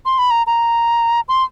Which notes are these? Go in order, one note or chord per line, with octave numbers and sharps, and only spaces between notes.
C6
B5
A#5
A#5
C6